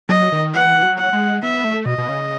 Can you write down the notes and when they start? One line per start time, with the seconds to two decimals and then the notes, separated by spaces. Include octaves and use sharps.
0.09 F#3 D#5
0.32 D#3
0.53 E3 F#5
0.83 F#3
0.98 F#5
1.13 G#3
1.43 B3 E5
1.64 A3
1.86 B2 D#5
1.98 B2
2.09 C#3